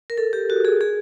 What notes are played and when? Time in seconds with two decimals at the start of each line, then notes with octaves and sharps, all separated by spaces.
0.10 A#4
0.18 A4
0.33 G4
0.50 F#4
0.65 G#4
0.81 G#4